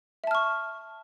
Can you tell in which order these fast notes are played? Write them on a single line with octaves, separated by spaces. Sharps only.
E5 A5 F6 C#6